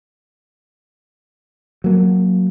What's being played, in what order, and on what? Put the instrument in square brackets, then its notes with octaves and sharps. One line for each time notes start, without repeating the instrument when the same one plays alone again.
[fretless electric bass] F#3 A#3